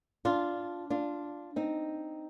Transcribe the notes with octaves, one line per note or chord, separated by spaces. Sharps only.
D4 F4
D4 F4
C4 D#4